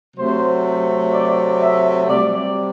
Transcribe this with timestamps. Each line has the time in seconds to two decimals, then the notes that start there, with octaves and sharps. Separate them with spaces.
0.16 C3 F#3 A3 C5
1.13 D5
1.60 E5
2.08 C3 G3 D5